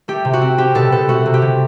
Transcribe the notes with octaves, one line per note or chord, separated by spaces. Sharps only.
A3 G4
C3
F#4
C4
C4 G4
B2 A4
B2 A4
A3 F#4
C3
G4
C3